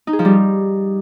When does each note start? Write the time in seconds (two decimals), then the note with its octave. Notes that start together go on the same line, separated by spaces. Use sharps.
0.07 D#4
0.13 G#4
0.19 F3
0.25 G3